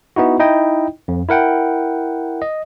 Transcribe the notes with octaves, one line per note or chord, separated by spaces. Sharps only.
B3 D#4 E4 F#4
D#4 E4 D#5 G5
F2
E4 A#4 F#5 G5
D#5